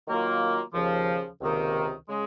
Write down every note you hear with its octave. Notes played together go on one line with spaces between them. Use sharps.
D#3 F#3 A#3 F4 A#4
D#2 C#3 F3
C#2 C3 D#3 A#3
C#3 G#3 C#4